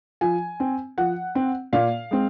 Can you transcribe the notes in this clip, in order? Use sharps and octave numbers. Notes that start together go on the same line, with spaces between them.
F3 G#5
C4
F3 F#5
C4
A#2 F5
G#3 C4